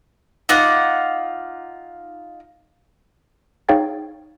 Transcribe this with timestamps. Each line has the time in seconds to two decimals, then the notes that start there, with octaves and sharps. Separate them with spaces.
0.49 D#4 F4 F#5 D6
3.69 D#4 G#4 C#5 F5 G5 A6